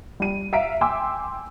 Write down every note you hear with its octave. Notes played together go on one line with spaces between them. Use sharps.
G3 D#7
E5 F5 A#5 B6 D7
G5 G#5 C6 D6 E6